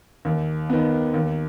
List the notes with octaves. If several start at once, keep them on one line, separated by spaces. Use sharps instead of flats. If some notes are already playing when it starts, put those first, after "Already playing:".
D#2
D#3 B3
D#2